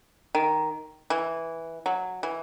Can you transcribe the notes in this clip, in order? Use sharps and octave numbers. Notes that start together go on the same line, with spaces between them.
D#3
E3
F#3
E3